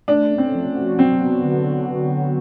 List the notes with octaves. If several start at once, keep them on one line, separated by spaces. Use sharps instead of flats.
A3 D4
C#4
C4
F3
F#4
F#3 C4
B3
D3
D3